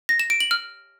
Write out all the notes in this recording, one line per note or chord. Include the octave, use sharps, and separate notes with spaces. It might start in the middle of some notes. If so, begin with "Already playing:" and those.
A#6
E7
D7
F#7
F6